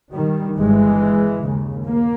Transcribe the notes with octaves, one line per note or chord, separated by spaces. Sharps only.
D#3 G3
G1 G2 E3 G#3
D#2 C#3
A#3